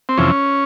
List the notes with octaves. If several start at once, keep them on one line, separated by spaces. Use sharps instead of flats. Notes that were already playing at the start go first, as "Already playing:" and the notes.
C4
F2 C3 E3 C#4